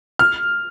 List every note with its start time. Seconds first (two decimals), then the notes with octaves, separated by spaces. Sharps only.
0.19 F6